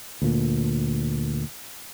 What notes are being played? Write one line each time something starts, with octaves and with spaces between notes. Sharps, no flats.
D2 A#2